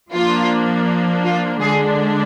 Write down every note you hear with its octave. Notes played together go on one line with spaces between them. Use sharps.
F3 A#3 D4 F4
F4
D3 G#3 D4 G#4